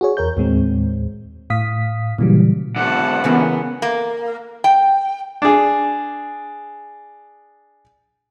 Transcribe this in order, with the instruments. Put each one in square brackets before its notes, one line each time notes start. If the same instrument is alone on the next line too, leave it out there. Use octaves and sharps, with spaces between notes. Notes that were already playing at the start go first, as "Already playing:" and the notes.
[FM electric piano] F#4 G#4 C#5
E2 A#4 C#5 G6
D#2 A2 G#3 C4
A2 F5 D#6 B6
A#2 C#3 E3 F#3 G3
[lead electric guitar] G#2 D3 [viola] F#5 A5
[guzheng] C#3 E3 A#3 [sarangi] B3
[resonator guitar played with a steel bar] A#3
G5
[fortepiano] D4 G#4